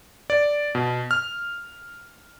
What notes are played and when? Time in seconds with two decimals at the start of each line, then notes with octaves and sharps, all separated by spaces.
0.30 D5
0.75 B2
1.11 F6